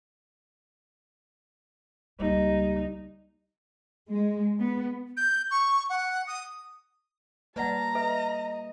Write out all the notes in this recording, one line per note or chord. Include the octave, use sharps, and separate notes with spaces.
C#2 G3 A#3 D#4
G#3
B3
G6
C#6
F#5
D#6
G3 A#3 B4 D5 F#5 A5 A#5
A4 B4 D#5 E5